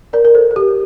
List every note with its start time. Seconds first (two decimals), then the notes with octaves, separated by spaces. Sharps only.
0.13 A#4 D5
0.25 A#4
0.35 A4 C5
0.51 A4
0.56 G4 A#4